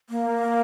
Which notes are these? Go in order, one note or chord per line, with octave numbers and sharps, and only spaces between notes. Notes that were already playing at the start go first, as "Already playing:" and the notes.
A#3